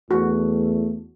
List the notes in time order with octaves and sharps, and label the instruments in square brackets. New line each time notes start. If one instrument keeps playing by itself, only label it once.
[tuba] E2 [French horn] A3 [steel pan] F#4